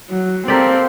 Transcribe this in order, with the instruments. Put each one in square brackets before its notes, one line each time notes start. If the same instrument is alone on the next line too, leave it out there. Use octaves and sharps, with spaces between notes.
[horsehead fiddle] F#3
[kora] A#3 G4 D5 [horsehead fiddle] C4 A4